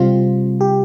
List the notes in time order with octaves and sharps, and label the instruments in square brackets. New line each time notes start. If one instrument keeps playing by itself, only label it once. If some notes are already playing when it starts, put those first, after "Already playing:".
Already playing: [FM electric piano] C3 G3 C4 F4
G4